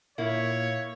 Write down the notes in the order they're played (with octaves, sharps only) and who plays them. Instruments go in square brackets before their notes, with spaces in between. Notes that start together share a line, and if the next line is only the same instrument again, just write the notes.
[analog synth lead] A#2 [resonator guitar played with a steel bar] A#3 E4 [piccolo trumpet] C#5 [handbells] E5 F5